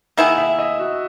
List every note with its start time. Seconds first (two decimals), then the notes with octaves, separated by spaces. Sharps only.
0.17 D#3 A#3 E4 G#4 F#5
0.38 E5
0.59 D#5
0.79 F#4